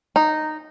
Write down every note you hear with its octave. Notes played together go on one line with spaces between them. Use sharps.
D#4